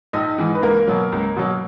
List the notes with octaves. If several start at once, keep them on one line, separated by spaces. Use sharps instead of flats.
A#1 D#4 D#5
G#2 E3
B4
C#2 A#3 A#4
B2 F#3
C#2
B2 F#3